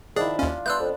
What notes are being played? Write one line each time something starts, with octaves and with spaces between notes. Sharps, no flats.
D#3 F3 D4 E4 G#4
D#2 C#4 F4
G2 B3 D4 E5 C6 E6 F#6 G6
F2